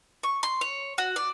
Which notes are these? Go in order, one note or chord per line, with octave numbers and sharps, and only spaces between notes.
C#6
C6
C#5
F#4
D5